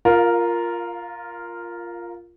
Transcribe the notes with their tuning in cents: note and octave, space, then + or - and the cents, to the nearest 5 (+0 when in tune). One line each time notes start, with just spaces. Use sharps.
F4 -5 A#4 +0 F5 +25